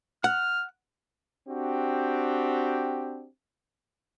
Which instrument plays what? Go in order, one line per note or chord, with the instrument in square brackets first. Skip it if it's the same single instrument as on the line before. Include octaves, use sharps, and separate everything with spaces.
[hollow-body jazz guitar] F#5 [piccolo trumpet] F6
[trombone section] C4 D4 F#4 G4